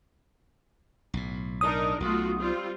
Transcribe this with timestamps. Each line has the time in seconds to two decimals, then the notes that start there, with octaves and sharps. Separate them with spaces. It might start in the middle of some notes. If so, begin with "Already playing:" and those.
1.14 B1 A2
1.61 D4 D#4 A#4 D#6
2.00 B1 A3 F4 F#4
2.39 G3 C4 F4